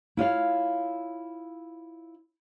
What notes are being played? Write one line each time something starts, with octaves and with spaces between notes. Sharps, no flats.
E4 F4 C#5 F5